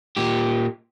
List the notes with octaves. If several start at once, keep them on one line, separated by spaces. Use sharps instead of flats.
A#2 G4